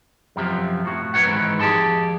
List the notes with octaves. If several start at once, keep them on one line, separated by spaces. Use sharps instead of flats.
F#2 C3 F3
A2 F#4
C4 B4 C#5 F#5
G#2 D#3 E3
F2 G4 G#4 A5 C6